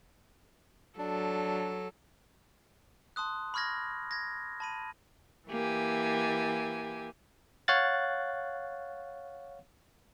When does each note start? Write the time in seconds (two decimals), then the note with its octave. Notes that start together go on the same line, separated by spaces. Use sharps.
0.99 F#3 D4 A4
3.16 A5 C6 D#6 F#6
3.54 B5 C#6 F6 G#6 A#6
4.11 G#6 A#6
4.60 A5 B5 D#7
5.48 E3 A#3 G4 G#5
7.68 C#5 F5 F#5 F#6 A6